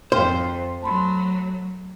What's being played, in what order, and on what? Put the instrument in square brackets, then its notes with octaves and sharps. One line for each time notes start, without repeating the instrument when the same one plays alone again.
[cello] F2 [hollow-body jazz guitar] C5 [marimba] F5 G5 F6
[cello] F#3 A3 [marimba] A5 B5 C6